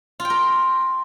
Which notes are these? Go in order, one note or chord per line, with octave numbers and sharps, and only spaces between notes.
F4
G5
A#4